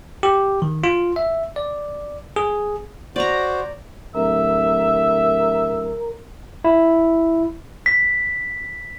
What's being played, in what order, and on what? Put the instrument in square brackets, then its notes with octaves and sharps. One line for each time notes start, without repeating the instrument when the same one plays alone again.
[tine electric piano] G4
D#3
F4
E5
D5
G#4
[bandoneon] F#4 C5 [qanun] D5 A#5
[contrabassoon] D1 [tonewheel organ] A#4 [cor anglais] E5
[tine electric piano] E4
[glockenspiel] B6